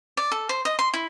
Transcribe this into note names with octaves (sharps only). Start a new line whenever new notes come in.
D5
A4
C5
D#5
C6
E4